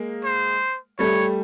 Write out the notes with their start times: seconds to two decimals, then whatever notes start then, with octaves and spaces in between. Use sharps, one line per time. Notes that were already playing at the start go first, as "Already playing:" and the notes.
Already playing: G#3 A#3
0.24 C5
0.99 G3 A3 C#5